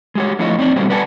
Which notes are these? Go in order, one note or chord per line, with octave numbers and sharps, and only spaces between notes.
G#3 G4 C#5
D3 F3 A3 E4 C#5 D#5
C4 D#4 C#5 D5
B2 D3 F#3 G3 A3 C4
B4 D5 F#5 G#5 A5